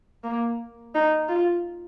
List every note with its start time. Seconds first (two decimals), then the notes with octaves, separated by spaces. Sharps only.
0.24 A#3
0.95 D#4
1.29 F4